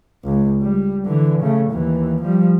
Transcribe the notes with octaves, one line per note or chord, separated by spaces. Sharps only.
C#2
G3
D3 E3
C#3 A3
D#2 E3
F3 G3